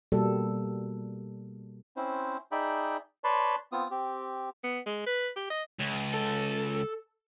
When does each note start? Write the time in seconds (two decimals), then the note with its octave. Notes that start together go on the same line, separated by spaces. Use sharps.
0.12 B2 G3 A#3 A4
1.97 C4 C#4 E4 C5
2.52 D#4 G#4 D5 E5 G5 B5
3.24 B4 C#5 D5 A5 B5 C6
3.72 B3 C4 F4 D#6
3.91 C4 G4
4.64 B3
4.86 G#3
5.06 B4
5.37 G4
5.50 D#5
5.79 C#2
6.14 A4